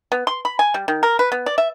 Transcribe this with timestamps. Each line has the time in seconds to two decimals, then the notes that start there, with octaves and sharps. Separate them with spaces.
0.12 B3
0.27 C6
0.45 B5
0.59 G#5
0.74 G3
0.88 D#3
1.03 A#4
1.19 B4
1.32 B3
1.46 D5
1.58 E5